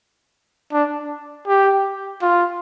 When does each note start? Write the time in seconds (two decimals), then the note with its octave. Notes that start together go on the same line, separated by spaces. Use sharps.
0.73 D4
1.47 G4
2.22 F4